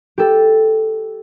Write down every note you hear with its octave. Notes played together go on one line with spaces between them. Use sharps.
G4 A4